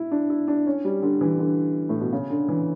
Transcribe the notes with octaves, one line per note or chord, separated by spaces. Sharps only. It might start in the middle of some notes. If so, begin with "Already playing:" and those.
Already playing: E4
D4
E4
D4
C#4
G3
D3
E3
D3
A2
B2
C#3
D3
E3